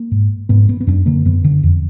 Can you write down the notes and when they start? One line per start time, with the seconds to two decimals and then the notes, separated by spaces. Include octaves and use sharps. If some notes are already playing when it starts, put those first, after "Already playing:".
Already playing: A#3
0.11 G#2
0.49 G#2 B3
0.69 B3
0.81 B3
0.87 F#2 D4
1.06 D3 A#3
1.25 F#2 B3
1.44 D3
1.63 F2